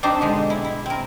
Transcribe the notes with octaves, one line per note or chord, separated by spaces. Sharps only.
C4 D4 D#4 G4 C5
B2 D3 G#3
E4
E4
C4 A#4